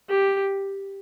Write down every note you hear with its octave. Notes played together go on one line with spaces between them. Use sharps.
G4